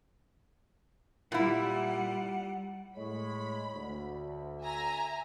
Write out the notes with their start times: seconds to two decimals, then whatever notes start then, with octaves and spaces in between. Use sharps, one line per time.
1.32 A#2 G3 E4 F#5
2.97 A2 G#3 C#5 B5
3.75 D2
4.62 E5 G#5 A#5